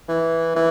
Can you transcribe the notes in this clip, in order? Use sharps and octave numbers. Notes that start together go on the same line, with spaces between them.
E3
E3